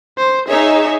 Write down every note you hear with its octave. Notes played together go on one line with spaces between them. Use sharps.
C5
D#4 G#4 C#5 E5